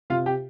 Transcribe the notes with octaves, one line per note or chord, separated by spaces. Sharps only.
C3 F4 F5
G4 G5